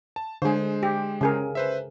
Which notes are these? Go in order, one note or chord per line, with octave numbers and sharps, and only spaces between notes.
A5
D3 G#3 G#4 C5
G4
C#3 G#4 A#4
B4 C5 E5